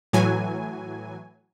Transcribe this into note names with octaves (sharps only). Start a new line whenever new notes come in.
A2 E3 F#3 G#5